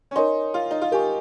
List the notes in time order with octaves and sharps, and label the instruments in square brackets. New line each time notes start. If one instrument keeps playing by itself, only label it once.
[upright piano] C#4
[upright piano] D#4 [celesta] A#4 C#5 G#5 C6
[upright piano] F4
D#4
F4
[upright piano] G4 [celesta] A#4 D#5 G#5 C#6